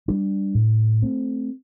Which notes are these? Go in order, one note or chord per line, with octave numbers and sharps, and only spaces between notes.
G3 D4
A2
A3 C4